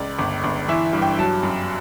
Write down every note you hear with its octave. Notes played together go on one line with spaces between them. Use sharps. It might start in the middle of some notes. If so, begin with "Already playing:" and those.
Already playing: C#2 D5
G1
G1
E3 E5
G2
G5
F#3 A5
F#2